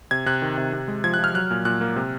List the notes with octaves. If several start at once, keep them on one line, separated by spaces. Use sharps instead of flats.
C3 G#6
C3 F#6
D#3
C3
C3
G#3
F3 G#6
F#6
F3 F6
F#3 F#6
A#2
A#2 F#6
A#3
C3